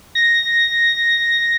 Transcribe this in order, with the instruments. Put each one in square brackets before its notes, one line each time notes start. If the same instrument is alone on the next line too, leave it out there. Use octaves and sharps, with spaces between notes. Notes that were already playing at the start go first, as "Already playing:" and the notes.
[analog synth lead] A#6